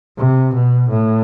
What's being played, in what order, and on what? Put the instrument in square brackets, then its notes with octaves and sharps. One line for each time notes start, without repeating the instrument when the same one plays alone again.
[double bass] C3
B2
A2